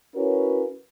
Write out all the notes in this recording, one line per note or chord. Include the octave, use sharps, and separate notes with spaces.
C#4 E4 F#4 A#4 B4 C#5